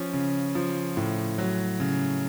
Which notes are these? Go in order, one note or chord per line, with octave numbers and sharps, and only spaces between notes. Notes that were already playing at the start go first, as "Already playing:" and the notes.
Already playing: F3 C#4
C#3
F3
A2
F#3
C#3